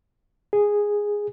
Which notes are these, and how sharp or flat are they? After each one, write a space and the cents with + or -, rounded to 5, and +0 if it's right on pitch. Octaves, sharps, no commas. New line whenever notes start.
G#4 -5